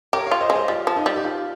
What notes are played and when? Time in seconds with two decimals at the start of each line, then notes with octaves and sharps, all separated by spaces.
0.13 G4 A#4 C#5
0.27 F4 C#5 F5
0.41 C5 D#5
0.50 G#3
0.55 C5 D#5
0.68 G3 F4
0.87 F3
0.96 D#4
1.06 G3
1.16 G4
1.24 F4